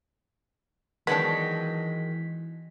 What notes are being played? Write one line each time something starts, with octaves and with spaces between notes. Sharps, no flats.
D#3 E3 F#3 G#3 B3 D4 B6